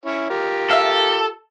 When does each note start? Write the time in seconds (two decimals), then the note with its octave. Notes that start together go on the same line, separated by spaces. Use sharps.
0.06 C#4 E4 C#5
0.30 F4 G4 A#4
0.71 A4 E5 F5